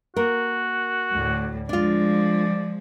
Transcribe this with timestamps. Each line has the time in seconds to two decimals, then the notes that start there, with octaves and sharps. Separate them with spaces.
0.16 A#3 F#4 A#4
1.12 D2 A2
1.69 F3 G#3 D4 F4 D5